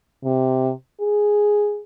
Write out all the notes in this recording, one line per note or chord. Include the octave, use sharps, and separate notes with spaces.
C3
G#4